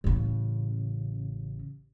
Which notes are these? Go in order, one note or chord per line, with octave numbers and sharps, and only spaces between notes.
A1 C#3